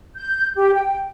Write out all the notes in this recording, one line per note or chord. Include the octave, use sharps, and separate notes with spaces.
G6
G4
G5